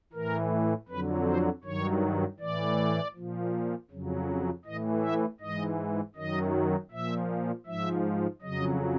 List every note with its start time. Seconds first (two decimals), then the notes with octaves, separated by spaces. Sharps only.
0.13 A2 E3 A#4
0.89 F2 D3 F#3 B4
1.27 C5
1.64 G2 D#3 F#3 C#5
2.40 A2 E3 D5
3.14 A#2 F3
3.91 F2 C#3 F#3
4.65 A2 E3 D#5
5.03 E5
5.40 G#2 E3 D#5
6.15 F#2 D#3 F#3 D#5
6.91 A#2 F3 E5
7.66 G#2 F3 E5
8.42 F2 C#3 F#3 D#5